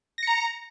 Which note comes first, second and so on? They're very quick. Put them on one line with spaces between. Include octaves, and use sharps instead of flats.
A#6 C#7 A#5